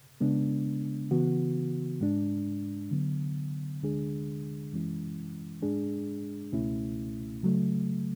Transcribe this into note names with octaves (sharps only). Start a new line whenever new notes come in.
C#3 G#3 B3 D4
C#3 E3 B3 F#4
G#2 G#3 D4
D3 F#3 B3
D2 D3 G#3 D4 G#4
F#2 E3 G#3 C#4 E4
G#2 G#3 D4 G#4
C#2 B2 A3 C#4 E4
C#3 F#3 A3